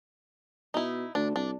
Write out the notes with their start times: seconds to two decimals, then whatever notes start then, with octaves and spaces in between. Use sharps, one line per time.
0.74 B2 D#4 E4
1.15 D2 D4
1.36 C2 D4